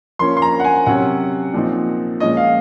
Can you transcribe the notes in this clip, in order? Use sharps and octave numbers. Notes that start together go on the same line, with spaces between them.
F3 A#3 C#4 C6
C6
A#5
F#5
G#5
C3 F#3 C#4 F#5
A#2 F3 C4 D#4
A#2 F3 G#3 C#4 D#5
F5